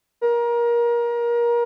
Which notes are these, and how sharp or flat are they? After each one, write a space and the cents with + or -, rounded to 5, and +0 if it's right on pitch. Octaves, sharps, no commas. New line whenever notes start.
A#4 +25